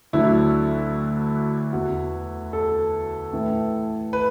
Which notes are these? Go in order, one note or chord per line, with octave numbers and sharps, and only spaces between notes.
D2 D3 F#3 E4
E2 E3 F#4
A4
A2 E3
B4